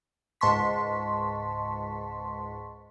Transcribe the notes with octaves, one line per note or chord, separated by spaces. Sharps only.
C#2 G#2 A5 C6 C#6 B6